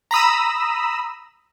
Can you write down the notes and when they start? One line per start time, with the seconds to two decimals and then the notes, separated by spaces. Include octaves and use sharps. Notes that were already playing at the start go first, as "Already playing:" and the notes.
0.11 A#5 B5 D#6 E6